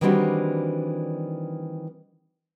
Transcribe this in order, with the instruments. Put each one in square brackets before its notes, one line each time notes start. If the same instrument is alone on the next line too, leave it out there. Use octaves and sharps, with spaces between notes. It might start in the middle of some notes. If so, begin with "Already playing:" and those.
[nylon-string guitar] D#3 E3 G3 C4 D4 F#4